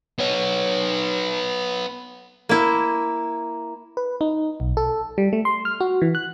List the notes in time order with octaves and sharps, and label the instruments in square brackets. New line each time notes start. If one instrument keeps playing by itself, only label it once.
[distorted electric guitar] B3 C#5
[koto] A#3 E4
[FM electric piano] B4
D#4
B1
A4
G3
A3
C6
F6
F#4
E3
F#6